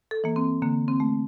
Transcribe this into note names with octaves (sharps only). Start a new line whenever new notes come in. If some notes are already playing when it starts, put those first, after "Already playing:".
A4
E3 A#3
C4
D3 A#3
C4
A3